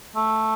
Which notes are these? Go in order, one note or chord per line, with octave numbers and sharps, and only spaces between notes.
A3